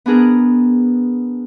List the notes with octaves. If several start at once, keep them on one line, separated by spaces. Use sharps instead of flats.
B3 D4 G#4 A#4 B4